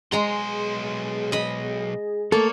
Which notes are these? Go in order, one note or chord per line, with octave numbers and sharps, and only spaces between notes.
B1 G#3 G#4 A#5 C6
D#5 B5
A3 A#3 A4 C#5